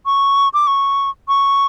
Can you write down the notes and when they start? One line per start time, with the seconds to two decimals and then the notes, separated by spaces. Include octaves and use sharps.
0.06 C#6
0.54 D6
0.67 C#6
1.28 C#6